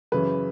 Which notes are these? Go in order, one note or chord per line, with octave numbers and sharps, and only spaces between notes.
F#2 C#3 E3 B4